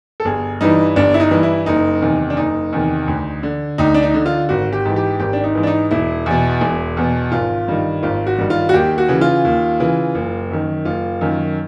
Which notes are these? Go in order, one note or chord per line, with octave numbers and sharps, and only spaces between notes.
A4
G1 G#4
G2 E3 D#4
G1 D4
E4
D#4
G2 E3
E4
F#1 D#4
E2 C3 D#3
D4
F#1 D#4
E2 C3 D#3
D2
D3
D2 D#4
D4
D#4
D3
F4
G#1 F#4
G4
G#2 E3
G4
G#1 G4
D4
D#4
G#2 E3
D4
D#4
E1 E4
E2 B2
E1
E2 B2
G#1 F4
G2 D#3
G#1 F4
F#4
G2 D#3
F4
F#4
D#2 G4
F#4
C#3 E3
F4
D#2
C#3 E3
F#1
F#2 D#3
F#1 F4
F#2 D#3